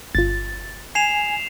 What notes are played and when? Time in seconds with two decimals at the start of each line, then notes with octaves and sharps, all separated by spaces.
0.15 G1 F4 A6
0.95 G#5 C7 E7 F7